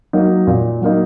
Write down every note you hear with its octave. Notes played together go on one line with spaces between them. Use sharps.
F#3 A#3 D#4
A#2
F#3 A#3 D#4